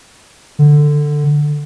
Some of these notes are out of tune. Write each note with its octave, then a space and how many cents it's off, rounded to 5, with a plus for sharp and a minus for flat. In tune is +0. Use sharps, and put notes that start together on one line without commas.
D3 +10